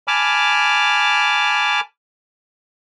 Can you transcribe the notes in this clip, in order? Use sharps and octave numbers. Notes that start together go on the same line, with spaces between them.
G#5 A5 B5 D6 F6